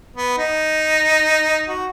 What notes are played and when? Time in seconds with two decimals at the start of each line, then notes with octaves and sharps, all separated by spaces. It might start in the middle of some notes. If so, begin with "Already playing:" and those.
0.16 B3
0.38 D#4
1.68 F#4